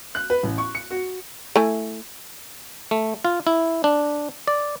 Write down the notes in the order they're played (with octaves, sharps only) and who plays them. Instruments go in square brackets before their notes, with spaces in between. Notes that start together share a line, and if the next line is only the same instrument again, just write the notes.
[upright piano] F#6
B4
A1
C#6
C#7
F#4
[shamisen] A3 E4 G#5
[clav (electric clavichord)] A3
F4
E4
D4
D5